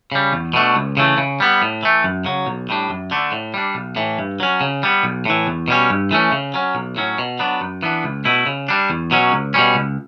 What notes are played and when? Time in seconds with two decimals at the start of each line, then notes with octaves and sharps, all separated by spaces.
0.12 C#3 G3
0.33 E2
0.54 B2 A3 D4
0.75 C#2
0.97 C#3 E3 A3
1.18 C#3
1.40 G3 B3
1.62 A2
1.83 E3 A3
2.04 F#2
2.25 C#3 F#3
2.47 B1
2.69 A2 G3 D4
2.90 F#2
3.11 D3 A3 D4
3.32 A2
3.54 G3 D4
3.75 B1
3.96 A2 E3
4.19 G2
4.40 F#3 C#4
4.61 C#3
4.83 G3 B3
5.03 B1
5.26 A2 E3
5.47 E2
5.68 B2 G3 C#4
5.90 G2
6.11 E3 A3 C#4
6.32 C#3
6.54 F#3 C#4
6.75 B1
6.96 A2 F#3 C#4
7.18 B2
7.39 F#3 B3 D4
7.61 F#2
7.83 E3 B3 D4
8.04 C#2
8.25 B2 A3 E4
8.46 C#3
8.68 G3 D4
8.90 E2
9.11 B2 F#3 C#4
9.32 C#2
9.54 B2 G3 C#4
9.75 C#2